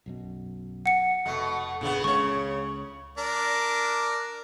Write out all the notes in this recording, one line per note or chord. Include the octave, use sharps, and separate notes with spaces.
B1 F#2 B2
F#5 C#7
F1 B2 A3
G1 A#2 C#3 B3 D4
C#2 C#3 G#3 C#4 C#5 C#6
D4 A#4 D5